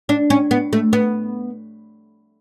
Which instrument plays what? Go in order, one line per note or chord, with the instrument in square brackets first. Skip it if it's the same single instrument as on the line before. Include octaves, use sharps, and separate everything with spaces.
[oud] D4
C#4
B3
A3
B3